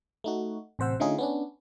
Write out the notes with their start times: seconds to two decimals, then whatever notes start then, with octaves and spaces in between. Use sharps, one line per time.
0.24 A3 D#4 F#4
0.79 A1 C3 C5 F#5 E6
1.00 D3 A3 C#4 D#4 F4 G#4
1.18 B3 C#4 D4